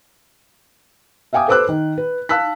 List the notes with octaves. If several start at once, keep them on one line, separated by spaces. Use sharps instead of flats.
E5 F5 G5 G#5 D6 D#6
A4 B4 C5 D6 E6 F#6
D#3
B4
F5 A5 E6 F#6 B6